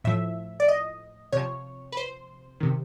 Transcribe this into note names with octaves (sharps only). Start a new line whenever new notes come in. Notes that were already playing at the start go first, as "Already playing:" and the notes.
A2 F3 E5
D5
D#5
C3 F3 C#5
B4
C5
C3 D#3